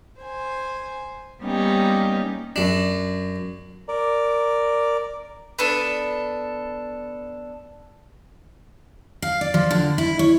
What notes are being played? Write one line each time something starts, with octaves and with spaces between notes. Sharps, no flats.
C5 G#5
G3 A#3 B3 C#4 D#4 G4
F#2 D4
A#4 D5
B3 D4 A4
F5
D5
F3
D3
E4
C#5